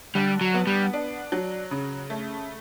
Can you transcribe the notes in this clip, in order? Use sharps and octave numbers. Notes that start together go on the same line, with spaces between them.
D3 G3
F#3
B3
G3
D4
F#3
C#3
A3